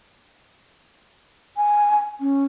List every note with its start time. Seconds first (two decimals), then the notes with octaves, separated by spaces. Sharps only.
1.57 G#5
2.20 C#4